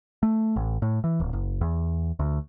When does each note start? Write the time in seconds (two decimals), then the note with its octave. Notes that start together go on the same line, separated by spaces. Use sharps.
0.23 A3
0.56 A1
0.82 A2
1.04 E3
1.20 D1
1.33 F#1
1.61 E2
2.19 D2